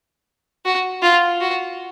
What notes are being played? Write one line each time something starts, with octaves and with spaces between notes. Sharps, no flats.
F#4
F4
F#4